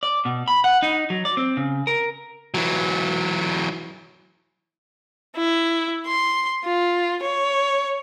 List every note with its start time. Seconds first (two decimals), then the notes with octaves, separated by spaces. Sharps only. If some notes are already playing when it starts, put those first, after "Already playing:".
0.03 D5
0.25 B2
0.48 B5
0.64 F#5
0.82 D#4
1.10 F#3
1.25 D5
1.37 C4
1.57 C#3
1.87 A#4
2.54 E3 F#3
5.37 E4
6.08 C6
6.65 F4
7.23 C#5